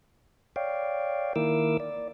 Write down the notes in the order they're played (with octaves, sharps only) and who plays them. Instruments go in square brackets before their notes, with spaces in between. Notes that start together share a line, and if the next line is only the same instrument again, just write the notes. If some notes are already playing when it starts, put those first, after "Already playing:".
[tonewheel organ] C#5 D5 F5 G5
D#3 A#3 E4 A#4 D6 E6
D5